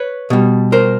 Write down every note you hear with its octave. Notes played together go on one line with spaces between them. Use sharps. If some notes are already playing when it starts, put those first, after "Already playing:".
Already playing: B4 C#5
B2 G3
A#4 C5